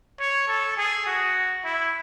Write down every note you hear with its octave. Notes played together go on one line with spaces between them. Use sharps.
C#5
A4
G#4
F#4
E4